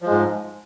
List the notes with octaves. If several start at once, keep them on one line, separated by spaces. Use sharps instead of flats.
G#2 F3 G#3